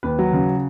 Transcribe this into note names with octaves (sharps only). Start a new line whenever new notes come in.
D#2 B4
F#3
C#3